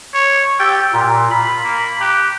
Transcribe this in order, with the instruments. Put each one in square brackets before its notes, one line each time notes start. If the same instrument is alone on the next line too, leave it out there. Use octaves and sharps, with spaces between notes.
[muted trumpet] C#5
[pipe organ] G4 A6 [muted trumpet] G5 [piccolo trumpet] E6
[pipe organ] A#2 [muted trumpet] F4 [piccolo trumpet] A#5
[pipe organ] B5
[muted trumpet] A#3
[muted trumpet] G4 [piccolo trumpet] F#6